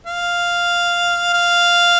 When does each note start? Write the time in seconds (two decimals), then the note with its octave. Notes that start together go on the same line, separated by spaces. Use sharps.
0.06 F5
1.33 F5